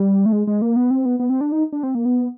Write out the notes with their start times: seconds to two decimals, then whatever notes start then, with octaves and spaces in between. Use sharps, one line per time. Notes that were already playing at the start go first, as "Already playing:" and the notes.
Already playing: G3
0.26 A3
0.32 G#3
0.47 G#3
0.62 A#3
0.76 B3
0.91 C4
1.05 B3
1.20 B3
1.30 C4
1.41 D4
1.52 D#4
1.73 D4
1.83 C4
1.95 A#3
2.05 B3